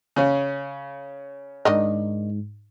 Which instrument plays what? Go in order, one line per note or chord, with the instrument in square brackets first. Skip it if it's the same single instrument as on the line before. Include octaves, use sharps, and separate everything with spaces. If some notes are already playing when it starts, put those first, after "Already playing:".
[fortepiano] C#3 C#4
[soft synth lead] G#2 [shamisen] D#3 D4 D#5